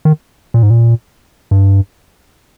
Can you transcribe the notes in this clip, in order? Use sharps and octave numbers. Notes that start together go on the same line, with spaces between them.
D#3
A#2
G#2
A#2
G2